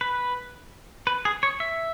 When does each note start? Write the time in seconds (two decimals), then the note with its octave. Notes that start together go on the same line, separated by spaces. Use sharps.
0.01 B4
1.07 B4
1.25 G#4
1.43 C#5
1.60 E5